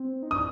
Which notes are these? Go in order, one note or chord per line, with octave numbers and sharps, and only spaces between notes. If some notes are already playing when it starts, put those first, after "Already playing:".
Already playing: C4
D#4
D4 D#6